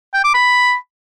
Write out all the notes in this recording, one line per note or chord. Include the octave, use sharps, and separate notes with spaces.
G5
D6
B5